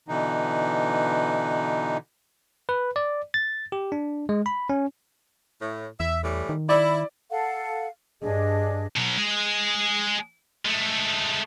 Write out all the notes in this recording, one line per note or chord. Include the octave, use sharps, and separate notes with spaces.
B2 D3 E3 D#4
B4
D5
A6
G4
D4
G#3
B5
C#4
A2
E2 E5
A2 E3 G3
D#3
E4 D5
A4 F5 F#5
G2 D4 G#4 D#5
B2 F#3
G#3 G#4
G#3 A3